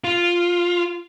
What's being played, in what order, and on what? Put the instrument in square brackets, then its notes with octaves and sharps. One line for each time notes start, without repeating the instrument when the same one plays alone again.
[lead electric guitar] F4